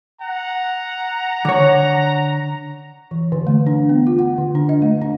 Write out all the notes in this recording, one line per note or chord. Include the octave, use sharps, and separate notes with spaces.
F#5 A#5
D3 C#5
E3
D3
A3
D4
B3
F4
F#5
D3
D4
D#5
A3
D4